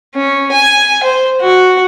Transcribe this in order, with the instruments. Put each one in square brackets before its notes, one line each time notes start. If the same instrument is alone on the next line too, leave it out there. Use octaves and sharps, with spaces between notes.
[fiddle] C#4
G#5
C5
F#4